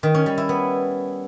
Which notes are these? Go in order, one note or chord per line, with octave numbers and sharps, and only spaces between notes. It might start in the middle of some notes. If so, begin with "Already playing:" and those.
D#3
C#4
G3
E4
B3